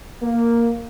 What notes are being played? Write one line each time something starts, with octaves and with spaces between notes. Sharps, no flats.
A#3